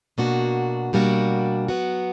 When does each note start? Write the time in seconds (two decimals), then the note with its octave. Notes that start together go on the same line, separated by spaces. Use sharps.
0.18 B2 A#3 D4 F#4
0.93 B2 G3 A#3 D4 F#4
1.68 F#3 B3 F#4